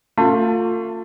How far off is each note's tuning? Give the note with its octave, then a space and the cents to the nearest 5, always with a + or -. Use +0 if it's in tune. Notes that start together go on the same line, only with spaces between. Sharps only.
A3 +40 F4 +20